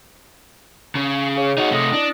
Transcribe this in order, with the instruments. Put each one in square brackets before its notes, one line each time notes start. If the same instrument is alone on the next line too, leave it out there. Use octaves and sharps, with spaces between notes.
[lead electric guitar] C#3
[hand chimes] G#4 C#5
[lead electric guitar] D#4 F#4 [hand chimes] D#5
[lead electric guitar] C3 A3 [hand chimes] D#6 A#6 C#7
[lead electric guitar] D4 [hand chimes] E4